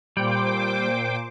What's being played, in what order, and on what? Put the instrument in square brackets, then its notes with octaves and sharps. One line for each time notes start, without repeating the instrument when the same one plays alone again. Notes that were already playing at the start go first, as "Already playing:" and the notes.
[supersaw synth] A#2 C5 D6 [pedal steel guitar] G3 [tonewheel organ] G5